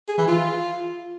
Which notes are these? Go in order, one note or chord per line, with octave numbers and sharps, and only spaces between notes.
G#4
E3
F4